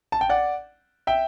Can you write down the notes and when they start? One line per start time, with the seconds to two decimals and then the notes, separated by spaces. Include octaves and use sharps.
0.12 A5
0.21 G5
0.29 D5 F#5
1.07 E5 G5